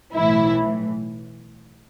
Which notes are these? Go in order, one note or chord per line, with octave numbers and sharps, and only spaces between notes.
B1 A2 E3 E4